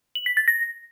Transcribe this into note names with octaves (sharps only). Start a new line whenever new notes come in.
F#7
B6
A6
A#6